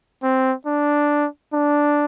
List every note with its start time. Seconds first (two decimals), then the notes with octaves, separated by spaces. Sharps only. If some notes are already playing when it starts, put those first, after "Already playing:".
0.23 C4
0.66 D4
1.53 D4